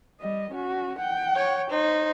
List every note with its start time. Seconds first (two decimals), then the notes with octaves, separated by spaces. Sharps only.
0.20 G3 D#5
0.51 C#4 F#4
0.99 F#5 G5
1.36 C#5
1.70 D#4 C5